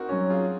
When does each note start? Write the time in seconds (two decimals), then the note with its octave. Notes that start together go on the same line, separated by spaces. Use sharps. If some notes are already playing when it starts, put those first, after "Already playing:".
Already playing: C4 D#4 F#4 A#4
0.09 F#3 C#4
0.29 F4 G#4